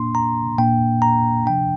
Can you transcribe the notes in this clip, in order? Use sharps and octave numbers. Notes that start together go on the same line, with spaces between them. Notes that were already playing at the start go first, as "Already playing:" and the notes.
Already playing: A#2 A#3 D4 C6
A#5
A#2 A#3 D4 G5
A#5
C3 F3 D4 G5